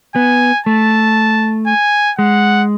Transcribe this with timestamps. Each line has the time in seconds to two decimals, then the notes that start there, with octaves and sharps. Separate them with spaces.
0.15 B3 G#5
0.66 A3 A5
1.67 G#5
2.18 G#3 F#5